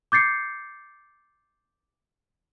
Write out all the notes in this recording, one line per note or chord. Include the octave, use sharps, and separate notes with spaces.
D6 G6 A6 C7 C#7